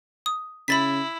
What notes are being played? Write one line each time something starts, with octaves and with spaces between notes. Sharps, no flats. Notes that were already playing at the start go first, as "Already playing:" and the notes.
D#6
C#3 E4 B5 A6 B6